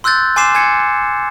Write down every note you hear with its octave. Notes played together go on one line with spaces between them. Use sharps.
C6 E6 F#6 G6 A6
G#5 C6 D6 C7 E7
G#5 G#6 C#7